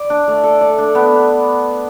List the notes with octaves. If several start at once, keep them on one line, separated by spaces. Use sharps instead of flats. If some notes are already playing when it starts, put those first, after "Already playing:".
Already playing: D5
D4
A3
A4
D5
D4
B3